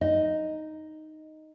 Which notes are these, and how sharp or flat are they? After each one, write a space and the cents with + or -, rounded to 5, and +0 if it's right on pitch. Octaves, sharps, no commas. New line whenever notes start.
D#4 +0 D#5 +0